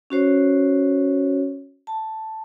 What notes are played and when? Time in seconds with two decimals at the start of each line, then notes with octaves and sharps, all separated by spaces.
0.10 C#4 F#4 C5 C#5
1.87 A5